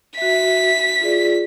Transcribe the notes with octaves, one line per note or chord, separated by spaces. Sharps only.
F#4 E5 B6
F4 G#4 D5